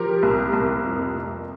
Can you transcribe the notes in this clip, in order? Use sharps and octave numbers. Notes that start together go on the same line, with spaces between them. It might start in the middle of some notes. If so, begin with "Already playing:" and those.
Already playing: F3 G4 A#4
C2
C2
F2
F1